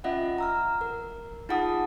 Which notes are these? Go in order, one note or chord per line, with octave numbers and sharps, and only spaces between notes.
C#4 F4 D#5 E5 F#5
A#5 E6 F6
A#4
D#4 F4 G#4 F#5 A5 D#6